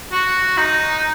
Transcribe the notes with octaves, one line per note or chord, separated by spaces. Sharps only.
F#4
D#4